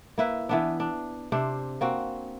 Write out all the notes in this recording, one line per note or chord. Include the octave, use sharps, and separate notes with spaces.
A#3 E4 B4
E3 B3 D4
D4
C3 D4 C5
A#3 C4 F#4